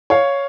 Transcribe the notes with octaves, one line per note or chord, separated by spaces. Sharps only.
C#5 F5